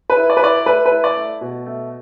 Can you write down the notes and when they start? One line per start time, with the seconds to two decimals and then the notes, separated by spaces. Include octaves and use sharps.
0.10 B4
0.17 E4
0.30 D5
0.37 B4
0.42 E4 D5
0.66 A3 B4
0.85 B4
0.91 E4
1.04 D5
1.17 A3
1.41 B2
1.66 A3